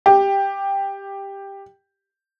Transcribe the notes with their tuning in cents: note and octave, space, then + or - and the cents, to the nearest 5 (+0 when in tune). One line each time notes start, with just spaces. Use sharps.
G4 +5